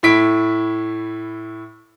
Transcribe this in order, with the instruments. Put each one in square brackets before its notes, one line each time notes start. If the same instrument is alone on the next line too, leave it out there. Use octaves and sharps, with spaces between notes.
[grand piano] A2 E4 B6 D7